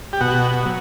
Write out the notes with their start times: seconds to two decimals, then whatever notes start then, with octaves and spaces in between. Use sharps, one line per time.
0.13 G4
0.21 B2 F#4
0.65 F#3